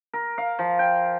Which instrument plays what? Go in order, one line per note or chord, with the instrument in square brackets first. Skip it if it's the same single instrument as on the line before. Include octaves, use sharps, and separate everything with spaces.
[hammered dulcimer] A#4
F5
F3
G5